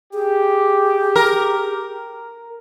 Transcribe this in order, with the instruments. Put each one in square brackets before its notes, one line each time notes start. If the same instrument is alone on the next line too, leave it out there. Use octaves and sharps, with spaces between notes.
[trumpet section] G4 [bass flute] G#4
[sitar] A#4